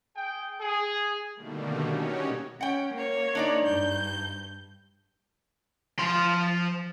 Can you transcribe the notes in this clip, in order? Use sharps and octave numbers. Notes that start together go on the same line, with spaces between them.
G#4 G5
G#4
B2 D3 D#3 G3 A3 A#3
C#4 D#4 F#4 G4 C#5
C#4 F#5 G5
A#3 C#5
D4 D#4 D5
G2 G6
F3 C6